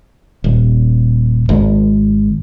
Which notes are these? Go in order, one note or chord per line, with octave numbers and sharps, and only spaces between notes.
D#1
G#1